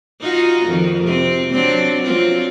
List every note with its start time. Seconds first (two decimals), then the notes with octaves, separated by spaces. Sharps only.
0.21 D#4 F4 F#4
0.66 F2 D#3
1.03 C3 C4
1.52 F#3 C4 D4
2.03 F#3 C4 F4